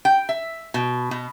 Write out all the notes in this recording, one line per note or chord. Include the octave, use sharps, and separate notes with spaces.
G5
E5
B2
B2